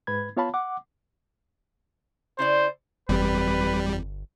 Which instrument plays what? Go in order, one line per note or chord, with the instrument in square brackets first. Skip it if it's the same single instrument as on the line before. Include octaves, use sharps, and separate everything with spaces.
[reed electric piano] G#2 B4 B5 G#6
B3 F4 C#5 F5 A5 B5
F#5 D6
[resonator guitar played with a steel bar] C#3 E4 D5 [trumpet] C5
[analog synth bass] G1 [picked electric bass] F2 E3 C4 [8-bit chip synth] G3 [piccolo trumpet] B4